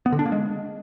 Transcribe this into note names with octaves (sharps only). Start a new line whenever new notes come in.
B3
D3
D4
A#3
G#3